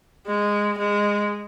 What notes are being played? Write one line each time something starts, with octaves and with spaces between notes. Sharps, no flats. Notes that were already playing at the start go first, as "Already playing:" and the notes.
G#3
G#3